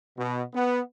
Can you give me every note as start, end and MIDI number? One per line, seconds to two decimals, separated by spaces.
0.18 0.42 47
0.54 0.81 59